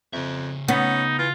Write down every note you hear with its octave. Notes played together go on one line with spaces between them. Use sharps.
F2 C#3 E5
B3 C#4 D#4
E3 F4